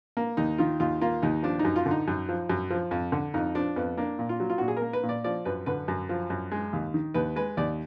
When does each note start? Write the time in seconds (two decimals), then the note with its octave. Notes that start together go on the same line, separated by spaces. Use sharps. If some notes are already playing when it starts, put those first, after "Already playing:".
0.17 A#3
0.37 D#2 D#4
0.58 D#3 F4
0.80 D#2 F4
1.01 A#3 F4
1.22 D#2 D#4
1.43 F3 D4
1.59 D#4
1.65 F#2
1.76 F4
1.86 D3
1.91 D#4
2.08 F#2
2.29 F3
2.50 F#2
2.70 F3
2.91 F2
3.12 D3
3.34 F2 D#4
3.55 F3 D4
3.76 F2 B3
3.97 A#3 D4
4.19 A#2
4.29 F4
4.40 F#3
4.50 F4
4.58 A#2 F#4
4.68 G#4
4.77 A#4
4.82 A#3
4.93 B4
5.03 A#2
5.09 D5
5.24 F3 D5
5.45 F#2 B4
5.66 D3 B4
5.88 F#2
6.09 F3
6.30 F#2
6.51 G#3
6.73 D#2
6.94 D#3
7.14 D#2 B4
7.36 G#3 B4
7.57 D#2 D5